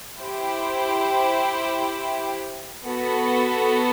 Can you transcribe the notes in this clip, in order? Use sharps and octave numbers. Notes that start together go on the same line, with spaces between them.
E4 G4 C5 G5
B3 F#4 A4